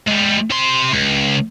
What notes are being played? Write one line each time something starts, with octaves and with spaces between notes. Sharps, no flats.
G3 G#3
C3 C6
C#2